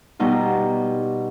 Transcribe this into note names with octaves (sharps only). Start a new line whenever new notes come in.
B2 G3 D#4 F4